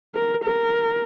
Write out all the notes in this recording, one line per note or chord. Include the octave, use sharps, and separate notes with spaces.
A#4
A#4